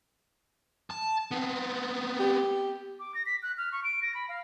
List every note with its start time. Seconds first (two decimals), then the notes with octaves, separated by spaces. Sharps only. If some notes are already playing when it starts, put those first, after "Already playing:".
0.90 A5
1.31 B3 C4
2.20 G4
2.99 D6
3.15 A#6
3.26 B6
3.43 F#6
3.57 F6
3.72 C#6
3.84 D7
4.02 A#6
4.15 B5
4.29 F5